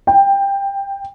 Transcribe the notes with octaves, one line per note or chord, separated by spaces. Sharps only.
G5